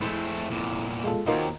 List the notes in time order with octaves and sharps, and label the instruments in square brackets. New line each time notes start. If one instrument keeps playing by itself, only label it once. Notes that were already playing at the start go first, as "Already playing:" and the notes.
[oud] F2 G#3 E4 [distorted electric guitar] A3 C4
[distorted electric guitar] E2 A#2
[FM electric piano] G#3 F4 A4
[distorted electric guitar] D#2 [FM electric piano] D#3 D#4 F4 [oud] F#3 A#3 C4